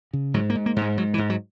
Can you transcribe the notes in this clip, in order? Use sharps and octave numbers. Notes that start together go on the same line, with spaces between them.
C#3
G#2 F#3
A#3
G#2
A#3
G#2
G#3
G#2 F#3
E3
G#2
F#3